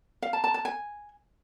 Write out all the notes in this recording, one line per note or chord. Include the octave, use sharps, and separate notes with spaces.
F5
A5
A5
A5
G#5